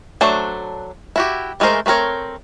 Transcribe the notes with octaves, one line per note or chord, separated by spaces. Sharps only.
F#3 A3 D4 C5
E4 F#4 G4
E3 G#3 A3 A#4 C5
A3 B3 C4 A#4 C#5